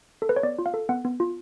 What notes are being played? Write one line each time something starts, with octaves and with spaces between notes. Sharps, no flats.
A4
B4
C#5
B3 D5
F4
F5
A4
B3 F#5
B3
F4